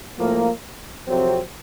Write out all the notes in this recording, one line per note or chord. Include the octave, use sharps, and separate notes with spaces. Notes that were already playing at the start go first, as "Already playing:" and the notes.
A2 F3 A#3
F2 C3 F#3 C4